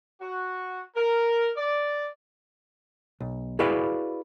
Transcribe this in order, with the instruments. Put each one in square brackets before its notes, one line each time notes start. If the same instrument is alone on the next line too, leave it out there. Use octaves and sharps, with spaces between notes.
[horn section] F#4
A#4
D5
[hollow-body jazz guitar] B1
E4 F#4 G#4 B4 D5 F5